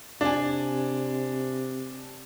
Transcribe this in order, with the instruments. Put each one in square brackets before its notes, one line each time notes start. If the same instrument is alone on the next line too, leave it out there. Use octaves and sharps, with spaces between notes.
[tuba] C3 [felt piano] D4 G#5